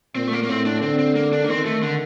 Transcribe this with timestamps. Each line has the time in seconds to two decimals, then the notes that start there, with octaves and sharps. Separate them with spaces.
0.15 A#2 C4
0.28 A3
0.32 A#3
0.43 A#3
0.49 A2 C4
0.66 D4
0.82 D3 C4
0.99 C4
1.15 A#3
1.33 D4
1.44 A#3
1.49 D#3 C4
1.66 A3
1.83 D3